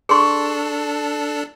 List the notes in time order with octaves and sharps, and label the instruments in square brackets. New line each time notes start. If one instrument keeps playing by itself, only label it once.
[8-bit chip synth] D4 A4 [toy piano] G#4 C6 C#6